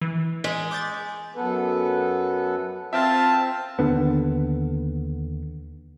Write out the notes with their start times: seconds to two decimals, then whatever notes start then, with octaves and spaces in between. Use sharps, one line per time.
0.01 E3
0.44 G#3 B6
0.71 D6 G6 A6
1.36 F#2 B3 A4 B4
2.93 C4 F4 E5 G5 A5 F6
3.79 D#2 D3 B3